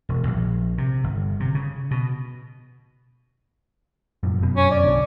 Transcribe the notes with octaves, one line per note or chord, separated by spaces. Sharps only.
E1
A#1
C3
G1
C3
C#3
B2
F1 F#2 A#2
F1 F#2 B2
C#4
D5
B1 D3